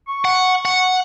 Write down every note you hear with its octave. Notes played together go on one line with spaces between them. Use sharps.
C#6
F#5
F#5